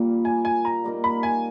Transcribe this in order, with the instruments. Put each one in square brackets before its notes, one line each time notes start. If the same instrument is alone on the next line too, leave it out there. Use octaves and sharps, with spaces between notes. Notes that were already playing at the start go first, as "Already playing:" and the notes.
Already playing: [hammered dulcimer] A#2 G3 A#3
[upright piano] G#5
G#5
A#5
[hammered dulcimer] G3 A#3 D#4 A#4
[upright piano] B5
G#5